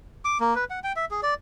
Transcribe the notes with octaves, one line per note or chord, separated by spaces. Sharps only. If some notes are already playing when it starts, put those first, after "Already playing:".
D6
A#3
B4
F#5
G5
E5
G#4
D5